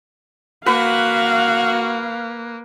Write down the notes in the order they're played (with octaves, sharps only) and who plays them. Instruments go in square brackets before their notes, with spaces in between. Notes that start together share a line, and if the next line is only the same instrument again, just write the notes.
[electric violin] A#3 [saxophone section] F#4 [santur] B4 [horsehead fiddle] F5